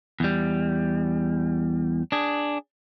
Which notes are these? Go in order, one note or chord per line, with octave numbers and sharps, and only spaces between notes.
E2 G3
D4 G#4